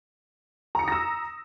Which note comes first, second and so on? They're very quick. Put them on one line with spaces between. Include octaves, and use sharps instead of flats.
A#5 C#7 D#6 A#6 E6